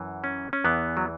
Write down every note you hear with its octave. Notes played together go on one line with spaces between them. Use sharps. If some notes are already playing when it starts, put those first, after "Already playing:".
Already playing: F#2 E3
C#4
C#4
E2 E3 B3
F#3